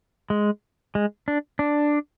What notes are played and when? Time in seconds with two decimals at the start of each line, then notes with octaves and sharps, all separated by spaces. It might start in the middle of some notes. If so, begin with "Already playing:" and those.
0.30 G#3
0.95 G#3
1.28 D4
1.59 D4